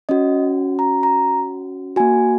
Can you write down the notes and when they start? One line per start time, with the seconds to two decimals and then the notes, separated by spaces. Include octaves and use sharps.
0.09 C#4 F#4 D#5
0.79 A#5
1.03 A#5
1.96 A#3 F#4 G#5